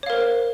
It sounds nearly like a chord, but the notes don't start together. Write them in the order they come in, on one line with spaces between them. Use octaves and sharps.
C#5 F5 A#4 C5